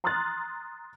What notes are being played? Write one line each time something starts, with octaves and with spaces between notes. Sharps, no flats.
A#5 C6 D#6 F6 F#6 A6